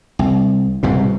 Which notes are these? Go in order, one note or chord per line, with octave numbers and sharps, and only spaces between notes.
C2
C2 G#2 B2